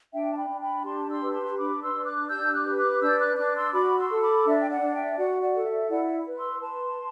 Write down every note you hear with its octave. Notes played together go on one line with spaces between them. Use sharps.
D4 E5 G5
A5
G5 B5
D4
G5 B5
G4 A5 C6
C6 E6
B4
A5 C6
D4 B5 D6
C6 E6
D4
D6 F#6
G4 E6 G6
D6 F#6
B4
D6 F#6
D4 E6 G6
D6 F#6
D4 D6 F#6
C6 E6
F#4 B5 D6
C6 E6
A4
B5 D6
D4 E5
G5
D5 F#5
D4
E5 G5
F#4 D5 F#5
D5 F#5
A4
E5
E4 D5 F#5
B4
C6 E6
B4 A5 C6